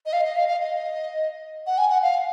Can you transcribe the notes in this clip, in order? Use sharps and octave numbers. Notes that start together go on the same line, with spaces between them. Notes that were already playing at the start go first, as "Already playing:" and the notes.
D#5
F5
D#5
F5
F5
D#5
F#5
G#5
F#5
F5